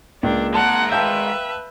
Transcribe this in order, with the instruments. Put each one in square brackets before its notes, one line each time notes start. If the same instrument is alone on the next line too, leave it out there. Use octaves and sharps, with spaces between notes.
[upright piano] C#2 [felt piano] A#3 [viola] D4
[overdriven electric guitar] G#3 A#4 [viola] F#5 [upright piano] A5
[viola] B4 E5 [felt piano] F5 G5 A5 [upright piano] G6